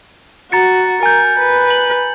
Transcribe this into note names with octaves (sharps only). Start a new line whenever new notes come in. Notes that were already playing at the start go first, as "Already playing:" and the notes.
F#4 A#5 A6 C#7
A#4 G#5 G6
B4
F#7